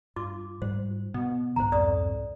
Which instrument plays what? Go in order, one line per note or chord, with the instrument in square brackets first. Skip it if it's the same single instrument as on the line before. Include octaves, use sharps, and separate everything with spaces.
[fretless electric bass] G2 [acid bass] F4 [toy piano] D6
[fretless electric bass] G#2 G3 [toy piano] C5
[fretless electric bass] B2 [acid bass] B3
[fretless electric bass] C2 G#2 D3 [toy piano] C5 A#5
[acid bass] F2 [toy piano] D5 D#6